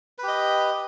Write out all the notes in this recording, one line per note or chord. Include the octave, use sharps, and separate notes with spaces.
G4 B4 D#5